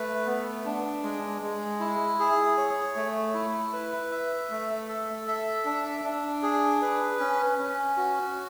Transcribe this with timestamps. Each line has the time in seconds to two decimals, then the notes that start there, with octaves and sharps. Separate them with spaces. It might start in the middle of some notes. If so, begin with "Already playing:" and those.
Already playing: A3 B4
0.26 B3
0.65 D4
1.03 G#3
1.42 G#3
1.80 E4
2.20 G#4
2.58 C#5
2.96 A3
3.34 E4
3.73 B4
4.11 E5
4.51 A3
4.89 A4
5.28 E5
5.65 D4
6.04 D4
6.43 G#4
6.82 B4
7.19 C#4
7.59 C#4
7.97 F#4